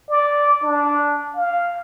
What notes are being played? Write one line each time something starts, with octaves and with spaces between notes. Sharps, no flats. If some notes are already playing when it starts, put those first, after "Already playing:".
D5
D4
F5